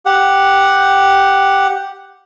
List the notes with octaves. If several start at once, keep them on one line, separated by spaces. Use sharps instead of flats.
G4 F#5